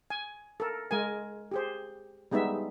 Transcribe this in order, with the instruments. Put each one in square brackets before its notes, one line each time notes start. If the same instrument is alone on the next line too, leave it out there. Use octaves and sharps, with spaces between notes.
[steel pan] G#5
A4 A#4
G#3 A#4 G#5
G4 G#4 C5
G3 G#3 B3 D#4 E5